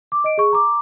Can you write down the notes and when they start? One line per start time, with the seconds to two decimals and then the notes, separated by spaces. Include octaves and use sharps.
0.12 D6
0.24 D#5 D7
0.38 G#4 C#6
0.53 A#5 D6